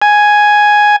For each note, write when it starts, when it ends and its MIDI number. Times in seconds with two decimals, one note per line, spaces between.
0.02 0.96 80